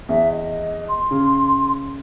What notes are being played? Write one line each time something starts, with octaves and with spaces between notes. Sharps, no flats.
E2 E5
D#5
C6
C#3